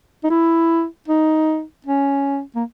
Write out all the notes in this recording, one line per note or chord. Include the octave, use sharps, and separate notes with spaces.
D#4
E4
D#4
C#4
A#3